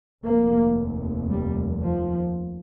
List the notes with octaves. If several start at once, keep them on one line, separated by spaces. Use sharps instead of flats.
F1 D#2 A#3
G3
F3